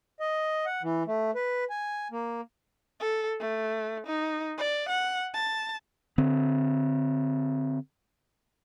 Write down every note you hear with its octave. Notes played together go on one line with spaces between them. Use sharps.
D#5
F#5
E3
A3
B4
G#5
A#3
A4
A3
D#4
D5
F#5
A5
D3 C4